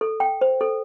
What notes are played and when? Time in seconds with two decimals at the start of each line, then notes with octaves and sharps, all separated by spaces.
0.01 A4
0.20 G5
0.41 C5
0.61 A4